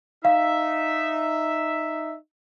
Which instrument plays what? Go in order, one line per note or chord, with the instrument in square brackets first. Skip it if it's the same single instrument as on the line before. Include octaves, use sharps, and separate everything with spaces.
[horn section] D#4 E5 [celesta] F5